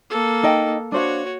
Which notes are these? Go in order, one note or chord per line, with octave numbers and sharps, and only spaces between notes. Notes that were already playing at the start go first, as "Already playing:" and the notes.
A#3 A4
D#4 D#5 G5
D4 F#4 C5 C#5 F5